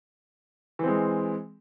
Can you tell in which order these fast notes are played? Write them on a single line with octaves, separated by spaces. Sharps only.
E3 C4 G#3